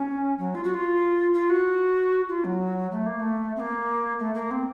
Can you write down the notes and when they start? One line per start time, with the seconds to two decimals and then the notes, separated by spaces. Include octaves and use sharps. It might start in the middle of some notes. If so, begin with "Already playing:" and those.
Already playing: C#4
0.38 F#3
0.55 F4
0.64 F#4
0.74 F4
1.33 F4
1.50 F#4
2.29 F4
2.44 F#3
2.92 A3
3.06 A#3
3.20 A3
3.56 C4
3.60 A#3
4.19 A3
4.34 A#3
4.51 C4